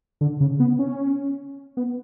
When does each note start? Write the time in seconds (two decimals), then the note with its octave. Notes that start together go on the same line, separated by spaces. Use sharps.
0.21 D3
0.40 C#3
0.60 B3
0.79 C#4
1.77 B3